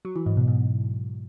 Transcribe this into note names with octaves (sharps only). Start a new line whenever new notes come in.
F#3
E3
G#2
B2
G#2